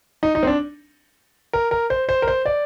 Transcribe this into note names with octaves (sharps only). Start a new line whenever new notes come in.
D#4
D#4
C4
D4
A#4
A#4
C5
C5
A#4
C5
D5